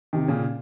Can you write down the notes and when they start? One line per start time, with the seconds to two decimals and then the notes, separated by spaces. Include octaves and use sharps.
0.13 C3 D#3
0.28 A#2 C#3